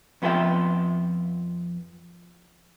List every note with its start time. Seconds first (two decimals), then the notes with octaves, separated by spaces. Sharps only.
0.22 F2 B3 F4 G#4 E5 G5